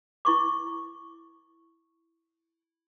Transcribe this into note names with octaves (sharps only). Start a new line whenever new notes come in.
E4 C#6 D6